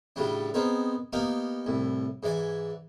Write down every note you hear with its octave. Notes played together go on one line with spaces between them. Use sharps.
A2 C#3 F#3 G3 D4
B3 C4 D#4 G#4 A#4
A#3 B3 D#4 G4 A#4
C2 A2
G#2 E3 D5 G#5